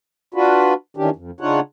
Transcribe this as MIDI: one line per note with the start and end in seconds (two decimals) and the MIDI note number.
0.34 0.74 62
0.34 0.74 65
0.34 0.74 66
0.34 0.74 71
0.97 1.10 51
0.97 1.10 52
0.97 1.10 61
0.97 1.10 62
0.97 1.10 67
1.16 1.31 41
1.40 1.60 49
1.40 1.60 62
1.40 1.60 63
1.40 1.60 65
1.40 1.60 73
1.40 1.60 78